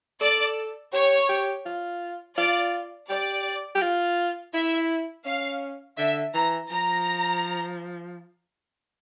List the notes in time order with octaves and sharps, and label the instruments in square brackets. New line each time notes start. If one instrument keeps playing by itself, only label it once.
[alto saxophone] A4 [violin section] D5
[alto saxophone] G4 [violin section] C#5
[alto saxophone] G4
F4
[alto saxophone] F4 [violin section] D5
[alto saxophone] G4 [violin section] D5
[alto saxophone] G4
F4
[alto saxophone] E4 [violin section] E5
[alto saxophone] C#4 [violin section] F5
[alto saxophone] D3 [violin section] E5
[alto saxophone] E3 [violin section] A#5
[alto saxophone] F3 [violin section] A#5